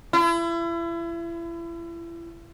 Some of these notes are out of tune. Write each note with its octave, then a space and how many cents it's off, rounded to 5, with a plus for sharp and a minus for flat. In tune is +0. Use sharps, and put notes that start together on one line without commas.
E4 +35